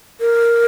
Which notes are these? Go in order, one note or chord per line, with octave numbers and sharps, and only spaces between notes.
A#4